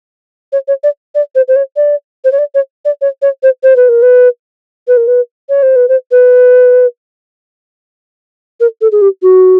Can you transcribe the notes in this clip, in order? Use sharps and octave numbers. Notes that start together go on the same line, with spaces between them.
C#5
C#5
D5
D5
C5
C5
C#5
D5
C5
C#5
D5
C#5
D5
C#5
C#5
C5
C5
B4
A#4
B4
B4
A#4
B4
C#5
C5
B4
C5
B4
A#4
A4
G#4
G4
F#4